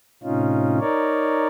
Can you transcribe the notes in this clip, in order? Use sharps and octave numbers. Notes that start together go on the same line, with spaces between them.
A2 C3 C#4 D#4 F4
D#4 A#4 C#5 D5